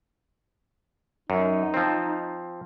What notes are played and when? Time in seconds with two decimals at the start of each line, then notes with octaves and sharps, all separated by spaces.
1.30 F#2 D#4
1.74 F3 C4